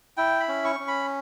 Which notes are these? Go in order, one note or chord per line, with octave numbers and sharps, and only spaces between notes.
E4 G5
B5
C#4
C#6
C#4
B5